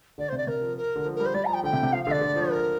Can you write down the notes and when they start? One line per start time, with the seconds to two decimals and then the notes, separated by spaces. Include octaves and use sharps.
0.18 D3 D5
0.28 C3 C5
0.37 D5
0.47 C3 A#4
0.62 F3
0.77 A#4
0.96 D3
1.05 F3
1.15 A#4
1.20 G3
1.25 C5
1.34 G3 D5
1.44 F3 A#5
1.53 G5
1.63 D3 G5
1.73 C3
1.83 C3
1.92 F3 F5
2.03 D3 F5
2.11 D5
2.21 D3
2.36 F3
2.51 A#4